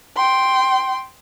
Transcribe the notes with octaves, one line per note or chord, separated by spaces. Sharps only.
G5 C6